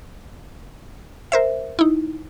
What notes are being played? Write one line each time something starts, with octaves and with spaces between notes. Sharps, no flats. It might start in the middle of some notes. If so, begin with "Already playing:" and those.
A#4 C5 E5
D#4 E4